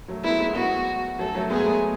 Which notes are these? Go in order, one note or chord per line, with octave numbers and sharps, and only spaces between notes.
F#3 A3
G#3 B3 E4
G#3 B3
G#3 B3 F#4
F#3 A3 A4
F#3 A3
G#3 B3 G#4
A3
G#3 B3